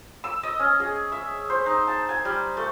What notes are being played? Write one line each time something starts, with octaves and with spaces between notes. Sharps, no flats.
E6
D#5
C#4
G#4
E5
C5
D#4
A5
G#5
G3
A3